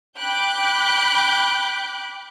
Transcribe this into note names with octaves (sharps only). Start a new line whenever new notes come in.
G5 B5 D6 F#6 G6